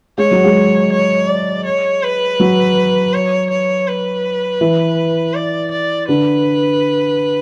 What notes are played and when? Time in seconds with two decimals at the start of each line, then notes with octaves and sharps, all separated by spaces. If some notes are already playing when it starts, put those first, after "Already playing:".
0.18 G#3 C#5
0.31 F#3
0.44 G#3
0.92 C#5
1.28 D5
1.66 C#5
2.03 B4
2.40 F#3
3.14 C#5
3.50 C#5
3.88 B4
4.61 E3
5.34 D5
5.71 D5
6.08 D3 B4